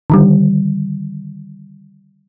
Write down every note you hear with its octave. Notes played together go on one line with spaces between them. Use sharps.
D3 D#3 G3